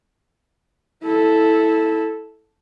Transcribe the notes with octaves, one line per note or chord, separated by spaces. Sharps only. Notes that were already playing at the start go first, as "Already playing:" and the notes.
E4 A4